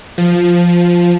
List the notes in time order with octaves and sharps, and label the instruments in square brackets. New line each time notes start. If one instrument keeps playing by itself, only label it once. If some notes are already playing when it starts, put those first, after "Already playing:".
[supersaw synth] F3